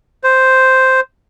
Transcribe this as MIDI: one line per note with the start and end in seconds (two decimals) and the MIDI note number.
0.24 1.00 72